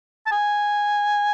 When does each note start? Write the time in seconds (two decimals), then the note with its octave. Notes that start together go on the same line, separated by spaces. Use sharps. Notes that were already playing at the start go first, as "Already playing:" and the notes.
0.26 A5
0.32 G#5